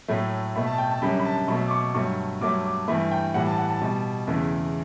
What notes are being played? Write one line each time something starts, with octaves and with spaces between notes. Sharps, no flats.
A2 F#3 A3
B2 A3 B5
A5
G5
A5
F#2 D3 G3 B5
B5
A5
B2 F#3 A3 B5
D6
C#6
G2 F#3 A3 C#6
G2 F#3 A3 D6
D6
G2 E3 A3 B5
G5
A2 E3 G3 F#5
A5
F#5
A5
B2 G3
E2 C#3 E3 A3